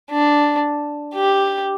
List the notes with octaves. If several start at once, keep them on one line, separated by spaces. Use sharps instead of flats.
D4
G4